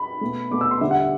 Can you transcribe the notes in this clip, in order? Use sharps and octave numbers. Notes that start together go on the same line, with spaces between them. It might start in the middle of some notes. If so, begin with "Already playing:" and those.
Already playing: B5
B2 A3
B2 A3 D6
E6
C6
D3 G3 E5
F#5
E5